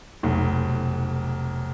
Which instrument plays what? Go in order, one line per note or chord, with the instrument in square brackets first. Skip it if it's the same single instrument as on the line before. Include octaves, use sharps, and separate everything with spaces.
[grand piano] F1 B1